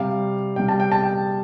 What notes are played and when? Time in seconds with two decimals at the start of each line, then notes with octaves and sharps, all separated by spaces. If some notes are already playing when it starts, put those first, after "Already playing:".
Already playing: C3 G3 F5
0.56 C3 G3 G5
0.68 A5
0.80 G5
0.91 A5
1.04 G5